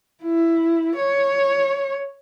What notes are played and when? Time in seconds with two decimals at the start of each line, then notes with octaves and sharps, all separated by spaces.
0.23 E4
0.96 C#5